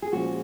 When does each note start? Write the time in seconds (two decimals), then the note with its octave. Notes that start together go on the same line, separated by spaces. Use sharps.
0.02 G#4
0.12 A#2 F3 G#3 C#4 F#4